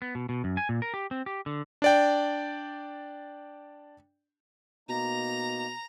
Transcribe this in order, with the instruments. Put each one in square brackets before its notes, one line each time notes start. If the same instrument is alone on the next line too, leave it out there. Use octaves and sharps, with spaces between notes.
[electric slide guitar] B3
B2
B2
F#2
G#5
A#2
A#4
G4
C4
G4
D3
[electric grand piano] D4 D5 G5
[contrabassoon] B2 [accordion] A#3 D#4 [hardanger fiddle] A#5